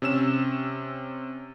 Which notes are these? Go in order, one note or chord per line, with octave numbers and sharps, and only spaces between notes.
C3 C#4 E6 E7